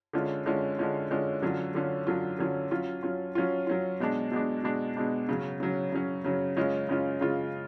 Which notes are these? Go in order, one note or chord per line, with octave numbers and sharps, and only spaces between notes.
D3 G#3 C#4 F4
D3 G#3 C#4 F4
D3 G#3 C#4 F4
D3 G#3 C#4 F4
D3 F#3 C#4 F4
D3 F#3 C#4 F4
D3 F#3 C#4 F4
D3 F#3 C#4 F4
F#3 C#4 F4
F#3 C#4 F4
F#3 C#4 F4
F#3 C#4 F4
B2 G#3 D4
B2 G#3 D4
B2 G#3 D4
B2 G#3 D4
C#3 F#3 C#4
C#3 F#3 C#4
C#3 F#3 C#4
C#3 F#3 C#4
C#3 G#3 C#4 F4
C#3 G#3 C#4 F4
C#3 G#3 C#4 F4